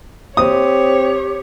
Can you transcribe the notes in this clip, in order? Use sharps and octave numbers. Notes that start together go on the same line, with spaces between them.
C4 G4 C#5 D#6